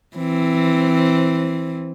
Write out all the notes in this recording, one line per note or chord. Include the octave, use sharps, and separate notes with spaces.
E3 C4